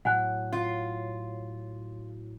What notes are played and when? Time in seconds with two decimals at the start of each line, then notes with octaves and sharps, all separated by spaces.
0.05 A2 F#3 F#5 G#5 F#6
0.52 F4